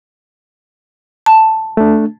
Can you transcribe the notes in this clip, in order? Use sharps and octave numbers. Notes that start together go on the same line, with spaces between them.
A5
A3 D4